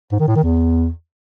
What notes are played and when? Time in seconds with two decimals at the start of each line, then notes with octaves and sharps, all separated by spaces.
0.12 G#2
0.20 D#3
0.28 A2
0.36 D#3
0.44 E2